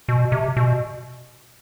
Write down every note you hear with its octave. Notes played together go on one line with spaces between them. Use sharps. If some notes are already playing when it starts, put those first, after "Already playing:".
B2
C3
B2